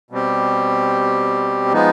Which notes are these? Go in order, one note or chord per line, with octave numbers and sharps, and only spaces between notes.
B2 G3 C4 G4
F3 G#3 B3 D#4